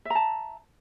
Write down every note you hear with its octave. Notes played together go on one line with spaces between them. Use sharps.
E5 A5 A#5